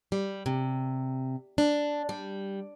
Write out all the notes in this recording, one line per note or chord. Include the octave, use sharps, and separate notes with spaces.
G3
C3
D4
G3